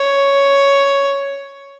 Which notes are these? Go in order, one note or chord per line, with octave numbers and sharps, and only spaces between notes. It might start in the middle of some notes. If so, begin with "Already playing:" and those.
Already playing: C#5